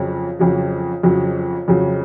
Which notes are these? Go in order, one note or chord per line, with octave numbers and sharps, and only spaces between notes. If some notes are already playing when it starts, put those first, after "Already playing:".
Already playing: F2 C#3 F#3
F2 C#3 F#3
F2 C#3 F#3
F2 C#3 F#3